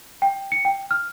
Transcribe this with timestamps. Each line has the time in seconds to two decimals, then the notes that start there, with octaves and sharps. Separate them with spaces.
0.22 G5
0.52 C#7
0.65 G5
0.91 F6